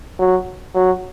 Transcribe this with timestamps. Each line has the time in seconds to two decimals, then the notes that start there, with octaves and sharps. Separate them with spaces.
0.19 F#3
0.74 F#3